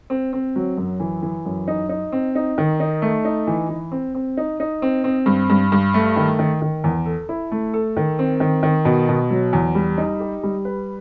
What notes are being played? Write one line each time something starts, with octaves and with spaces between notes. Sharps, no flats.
C4
C4
F#3
F#2
E3
E3
F#2
D#4
D#4
C4
D#4
D#3
D#4
A3
D#4
E3
E3
C4
C4
D#4
D#4
C4
C4
G2
G2
G2
A3
D#3
D#3
D#3
E2
A4
E4
A3
A4
D#3
C4
D#3
D#3
B2
B2
F#3
E2
G3
D#4
G4
G3
B4